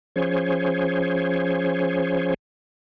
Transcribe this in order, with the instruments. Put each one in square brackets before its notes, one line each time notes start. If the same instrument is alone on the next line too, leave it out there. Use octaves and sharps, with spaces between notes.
[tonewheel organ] F3 C#4 G#4 C5 C#5